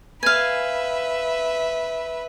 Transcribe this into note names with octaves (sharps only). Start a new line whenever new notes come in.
B4 E5 F5 G#5